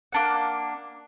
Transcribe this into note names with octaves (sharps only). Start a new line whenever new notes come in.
A#3 D4 F#5